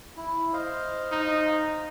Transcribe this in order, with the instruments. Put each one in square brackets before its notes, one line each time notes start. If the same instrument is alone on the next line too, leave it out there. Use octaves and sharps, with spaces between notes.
[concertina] E4
C5 D#5 F5
[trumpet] D#4